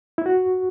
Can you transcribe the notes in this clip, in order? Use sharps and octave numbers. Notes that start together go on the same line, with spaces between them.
E4
F#4